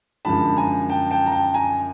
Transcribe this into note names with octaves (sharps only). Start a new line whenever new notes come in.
F#2 D3 F3 G#3 A5 B5
G#5 A#5
G5 A5
G5 A5
A#5
G5 A5
G#5 A#5